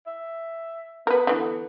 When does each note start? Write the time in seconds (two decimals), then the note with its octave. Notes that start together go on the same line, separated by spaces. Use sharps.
0.07 E5
1.07 B3 A#4 B4
1.27 D3 E3